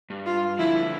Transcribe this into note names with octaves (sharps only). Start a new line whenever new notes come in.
G2
F4
D3 F3 E4